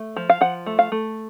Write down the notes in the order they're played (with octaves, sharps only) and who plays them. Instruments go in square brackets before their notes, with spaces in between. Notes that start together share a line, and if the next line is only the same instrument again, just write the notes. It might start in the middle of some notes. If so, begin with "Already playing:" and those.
Already playing: [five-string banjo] A3
F3
F5
F3 F#5
A3
F5
A3